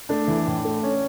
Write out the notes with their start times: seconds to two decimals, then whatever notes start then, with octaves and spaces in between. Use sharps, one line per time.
0.09 A3 D4
0.28 E3
0.47 A2
0.65 A3
0.83 C#4